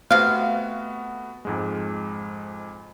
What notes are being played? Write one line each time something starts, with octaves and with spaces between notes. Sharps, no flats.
C3 A3 B3 F#4 F5
F2 G#2 G#3